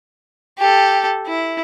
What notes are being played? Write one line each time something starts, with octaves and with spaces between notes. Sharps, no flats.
G4 A4
E4